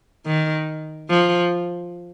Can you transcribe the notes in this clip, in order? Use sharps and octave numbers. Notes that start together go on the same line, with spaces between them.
D#3
F3